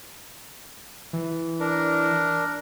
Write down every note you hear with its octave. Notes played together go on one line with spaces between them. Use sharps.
E3
D4 A#4